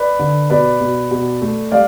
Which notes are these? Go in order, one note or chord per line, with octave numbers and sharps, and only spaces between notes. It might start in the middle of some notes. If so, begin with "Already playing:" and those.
Already playing: B4 D5
D3
B2 B4 D5
B2
B2
A3
G3 D5 F5